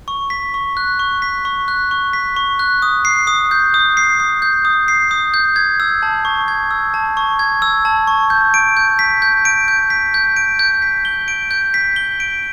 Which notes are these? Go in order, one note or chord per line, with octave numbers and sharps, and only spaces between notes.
C#6
B6
C#6
F#6
C#6
B6
C#6
F#6
C#6
B6
C#6
F#6
D#6
C7
D#6
G6
D#6
C7
D#6
G6
D#6
C7
D#6
G6
G#6
E6
A5
C#6
G#6
E6
A5
C#6
G#6
E6
A5
C#6
G6
D7
G6
B6
G6
D7
G6
B6
G6
D7
G6
B6
G7
D7
G6
B6
G7
D7